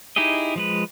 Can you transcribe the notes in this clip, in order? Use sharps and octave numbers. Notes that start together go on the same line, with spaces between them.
D#4 E4 G4 G#4 D#5
F3 G#3 B4